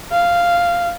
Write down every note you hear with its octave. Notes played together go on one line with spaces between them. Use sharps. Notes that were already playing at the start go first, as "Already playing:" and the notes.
F5